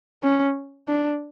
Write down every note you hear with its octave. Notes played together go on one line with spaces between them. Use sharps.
C#4
D4